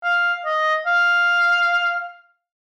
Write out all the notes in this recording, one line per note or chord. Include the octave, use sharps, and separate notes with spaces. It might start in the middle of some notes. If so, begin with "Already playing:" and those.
F5
D#5
F5